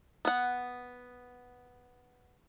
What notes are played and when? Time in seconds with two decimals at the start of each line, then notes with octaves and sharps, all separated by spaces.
0.25 B3 F#5